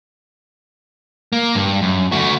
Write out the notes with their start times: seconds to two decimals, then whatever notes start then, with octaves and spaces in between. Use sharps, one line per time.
1.33 A#3
1.55 G2
1.82 F#2
2.12 A3 F#4